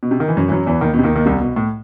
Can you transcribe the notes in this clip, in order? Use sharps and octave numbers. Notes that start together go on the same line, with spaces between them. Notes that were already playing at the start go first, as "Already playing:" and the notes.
B2
C3
D#3
E3
F#2 F#3
E3
F#2 F#3
E2 E3
D#2 D#3
B2
C3
D#2 D#3
D#2 D#3
C2 C3
B2
A2